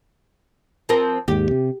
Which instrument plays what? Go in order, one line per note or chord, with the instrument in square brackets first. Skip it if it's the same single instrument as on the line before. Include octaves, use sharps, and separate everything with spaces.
[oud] F3 C4 A#4
[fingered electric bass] D#2 G#2 [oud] G4
[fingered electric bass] C3